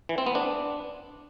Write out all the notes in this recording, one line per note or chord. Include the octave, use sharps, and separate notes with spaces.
E3
C4
B3
D4